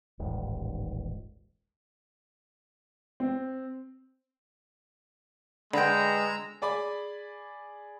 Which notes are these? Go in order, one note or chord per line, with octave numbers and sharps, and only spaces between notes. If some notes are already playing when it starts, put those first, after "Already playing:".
D#1 A1 G#2
C4
D3 G#3 B4 G5 A#5 E6
G#4 D5 G#5 B5 D6